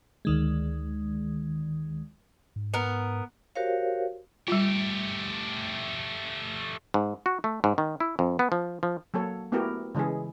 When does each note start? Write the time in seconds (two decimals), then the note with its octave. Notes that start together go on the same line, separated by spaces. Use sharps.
0.25 D2 D#3 G#3
2.56 G#2
2.74 B3 A#4
3.55 F#4 G4 A#4 C5 C#5 F5
4.48 G3 A3 F4 G4
6.94 G#2
7.26 F#4
7.44 A3
7.64 G#2
7.78 D#3
8.00 E4
8.19 F2
8.39 B3
8.52 F3
8.83 F3
9.14 F#3 A#3 A4 C#5
9.52 A3 B3 E4 F#4 G4 A#4
9.95 C#3 E3 G#3 E4 G#4